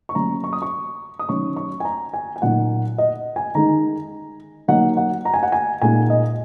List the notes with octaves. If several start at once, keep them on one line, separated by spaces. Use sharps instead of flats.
C#6
F#3 A#3 C#4 A#5
C#6
D#6
C#6
D#6
D#3 F#3 C#4 C#6
C#6
G#5
A#5
G#5
G#5
A#2 F#3 D#4 F#5
D#5
G#5
D#3 G#3 D#4 A#5
F#3 A#3 D#4 F#5
F#5
A#5
G#5
F#5
G#5
A#2 G#3 D#4 G#5
D#5